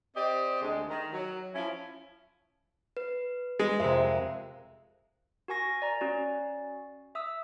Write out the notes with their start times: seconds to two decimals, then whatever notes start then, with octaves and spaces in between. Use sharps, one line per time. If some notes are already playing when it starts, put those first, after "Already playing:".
0.15 C4 G4 D5 D#5
0.61 D2 G#3
0.88 D#3
1.13 F#3
1.54 F3 C#4 E4
2.97 B4
3.59 G#3
3.80 F2 C3 A#4 C5 E5
5.48 F#4 A#4 G#5 C#6 A#6
5.82 D5 A#5
6.01 C#4 F#4 D5
7.15 E5 D#6 E6